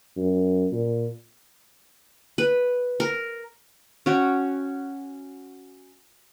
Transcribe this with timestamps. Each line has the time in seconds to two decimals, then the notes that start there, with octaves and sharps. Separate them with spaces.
0.17 F#2
0.72 A#2
2.38 B4
3.00 A#4
4.06 C#4 F#4 G5